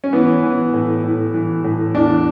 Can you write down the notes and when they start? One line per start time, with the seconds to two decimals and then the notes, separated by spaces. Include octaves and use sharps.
0.04 C#4
0.13 E3 B3
0.43 E3
0.73 A2
1.03 A2
1.34 E3
1.64 A2
1.95 E2 D4